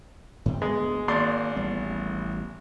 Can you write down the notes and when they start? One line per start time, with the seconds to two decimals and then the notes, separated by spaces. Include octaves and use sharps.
0.46 G#2 C3 C4
0.62 D2 G#3 A#3 B3
1.08 G#1 A#3 D5 C6
1.56 A1 G3 B3